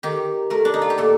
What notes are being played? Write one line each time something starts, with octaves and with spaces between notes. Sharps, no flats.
D#3 G4
A3 A#4
D4
D#4
F4
G4
A#2 A4